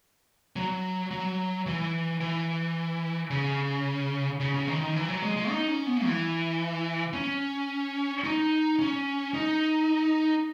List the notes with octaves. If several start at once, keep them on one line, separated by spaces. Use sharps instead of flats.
F#3
F#3
E3
E3
C#3
C#3
C#3
D#3
D#3
E3
F#3
G#3
G#3
D#4
C#4
B3
E3
C#4
D#4
C#4
D#4